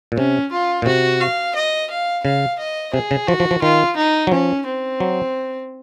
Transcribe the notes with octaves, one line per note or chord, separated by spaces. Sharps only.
A#2
C3 C#4
F4
A#2
C3 F#4
F5
D#5
F5
C#3 F5
D#5
C3 G#4
C#3
F3 F#4
F3
F3
D#3 F4
D#4
F#3
F3 C#4
C4
F#3